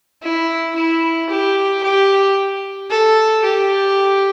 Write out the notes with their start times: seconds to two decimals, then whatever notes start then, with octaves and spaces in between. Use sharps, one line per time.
0.22 E4
0.75 E4
1.29 G4
1.83 G4
2.90 A4
3.44 G4